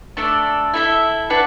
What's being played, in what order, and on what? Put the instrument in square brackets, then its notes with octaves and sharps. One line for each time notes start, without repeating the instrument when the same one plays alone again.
[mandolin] A3 D4 A4 D5
E4 A4 E5
D4 B4 F#5 A5